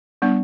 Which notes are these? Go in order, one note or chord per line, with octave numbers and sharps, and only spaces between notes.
G3 B3 D4